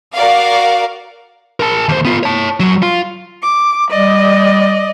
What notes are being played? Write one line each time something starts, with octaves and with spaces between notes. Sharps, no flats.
F#4 A#4 D5 F5 F#5
A#4 A5
D#2 C5
B3 F4
C#5 A5
F#2 F#3
F4
D6
G3 D5 D#5